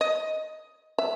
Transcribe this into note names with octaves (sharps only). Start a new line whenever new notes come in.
D#5
E5